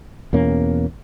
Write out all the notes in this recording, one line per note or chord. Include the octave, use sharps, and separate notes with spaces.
E2 B2 A#3 C#4